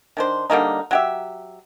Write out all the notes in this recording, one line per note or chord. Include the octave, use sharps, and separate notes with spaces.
D#3 D4 C5
D3 G3 A#3 D#4
F#3 G4 E5